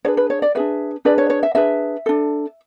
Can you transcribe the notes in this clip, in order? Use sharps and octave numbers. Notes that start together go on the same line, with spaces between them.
D4 G#4 B4 C#5
B4
C#5
D5
D4 G#4 B4 E5
D4 G#4 B4 D5
C#5
C#5
E5
D4 G#4 B4 E5
D4 A4